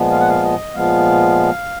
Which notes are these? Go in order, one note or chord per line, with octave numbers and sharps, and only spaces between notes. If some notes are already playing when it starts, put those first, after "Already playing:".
Already playing: A#2 F3 G#3 B3
F5
F#5
F5
D#5
A#2 F3 G#3 B3 F5